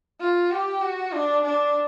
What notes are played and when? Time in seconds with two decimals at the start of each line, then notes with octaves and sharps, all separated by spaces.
0.21 F4
0.51 G4
0.81 F#4
1.12 D4
1.43 D4